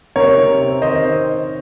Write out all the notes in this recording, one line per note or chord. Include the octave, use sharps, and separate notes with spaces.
C3 A#4 C#5
C3
C4
D#3 C5 D#5
C4